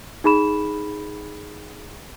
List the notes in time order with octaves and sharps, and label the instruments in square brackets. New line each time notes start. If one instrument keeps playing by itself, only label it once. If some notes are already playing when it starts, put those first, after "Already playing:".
[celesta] D#4 G#4 B5 E7